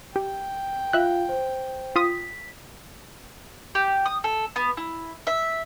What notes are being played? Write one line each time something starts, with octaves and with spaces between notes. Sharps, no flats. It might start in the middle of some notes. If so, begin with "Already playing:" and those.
G4 G5
F4 E5 F5 F#6
C5
F4 D#6 B6
G4
D#6
A4
B3
E4
E5